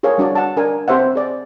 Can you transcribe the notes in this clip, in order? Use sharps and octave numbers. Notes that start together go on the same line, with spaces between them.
G4 G#4 A#4 C#5 F5
G3 D4 F#4 D5
F#5 A5
D4 A#4 G#5
C4 G4 C5 E5 F#5
G#4 D5